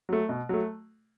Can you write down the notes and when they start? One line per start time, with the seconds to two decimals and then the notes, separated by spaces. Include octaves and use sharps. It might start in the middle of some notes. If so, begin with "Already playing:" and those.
0.09 F#3 A3
0.29 B2
0.49 F#3 A3